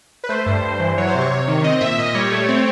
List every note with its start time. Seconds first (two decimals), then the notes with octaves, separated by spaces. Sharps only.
0.24 B4
0.29 A3 C5
0.46 G2
0.63 G2
0.80 E3
0.98 F#3 C#5
1.08 C5
1.14 C3
1.21 C#5
1.31 C3
1.47 D#3
1.64 C4 D#5
1.81 A#2 E5
1.98 A#2 D#5
2.14 G3 C#5
2.32 A3
2.48 C4